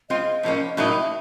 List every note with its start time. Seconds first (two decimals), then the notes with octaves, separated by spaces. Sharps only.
0.10 G#3 C4 F4 D#5
0.43 A2 F3 A#3 C#4
0.77 A2 F#3 A#3 D#4 E5
1.00 E5